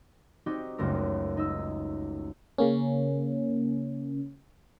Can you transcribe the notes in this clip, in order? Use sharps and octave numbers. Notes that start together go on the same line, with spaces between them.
C4 D#4 F#4 G4 D5
F#1 C#2 F#2 G3 A3 A#4
D#4 E6
C#3 A#3 C#4